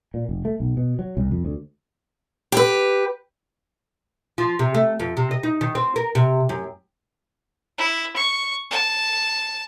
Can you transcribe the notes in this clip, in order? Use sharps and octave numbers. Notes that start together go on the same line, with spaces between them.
A#2
F1
A3
B1
B2
F#3
C2
F2
D2
G4 B4
F3
C3
A3
F2
C3
D#5
D#4
D#3
C4
A#4
C3
F#2
E4
C#6
A5